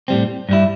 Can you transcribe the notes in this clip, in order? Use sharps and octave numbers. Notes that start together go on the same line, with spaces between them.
A2 G3 C4
G2 G3 E4